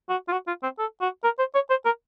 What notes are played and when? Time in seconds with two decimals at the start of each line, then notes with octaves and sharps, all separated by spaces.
0.09 F#4
0.28 F4
0.32 F#4
0.47 F4
0.63 C4
0.79 A4
1.01 F#4
1.24 A#4
1.39 C5
1.55 C#5
1.70 C5
1.85 A#4